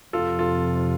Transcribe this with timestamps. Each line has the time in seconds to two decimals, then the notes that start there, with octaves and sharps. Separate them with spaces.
0.13 F2 C3 F3 F4 A4
0.39 F4 A4